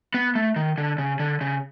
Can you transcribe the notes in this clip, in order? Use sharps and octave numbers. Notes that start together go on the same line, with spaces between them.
B3
A3
D#3
D3
C#3
D3
C#3